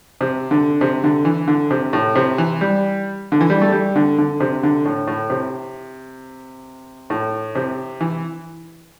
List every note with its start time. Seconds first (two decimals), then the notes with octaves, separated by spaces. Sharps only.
0.21 C3
0.51 D3
0.81 C3
1.04 D3
1.25 E3
1.48 D3
1.71 C3
1.93 A2
2.15 C3
2.38 E3
2.61 G3
3.32 D3
3.41 E3
3.50 G3
3.62 A3
3.72 G3
3.96 D3
4.18 D3
4.40 C3
4.63 D3
4.85 A2
5.07 A2
5.30 C3
7.10 A2
7.55 C3
8.01 E3